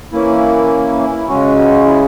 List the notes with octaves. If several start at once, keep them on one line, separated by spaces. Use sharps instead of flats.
E3 A#3 C#4 E4
E4
C#3 G#3 C#4 F#4
F#4
E4